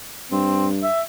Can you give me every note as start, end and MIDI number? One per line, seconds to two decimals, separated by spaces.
0.32 0.86 43
0.32 0.68 60
0.83 1.02 76